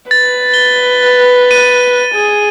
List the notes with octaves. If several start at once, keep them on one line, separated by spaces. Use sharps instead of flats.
B4 A6
G7
D#7
G#4